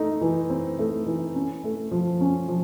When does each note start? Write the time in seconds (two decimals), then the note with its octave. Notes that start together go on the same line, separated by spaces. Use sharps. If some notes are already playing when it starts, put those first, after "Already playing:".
Already playing: A3 D#4
0.21 E3
0.50 C4
0.79 A3
1.06 E3
1.35 C#4
1.64 A3
1.91 F3
2.21 C#4
2.48 F3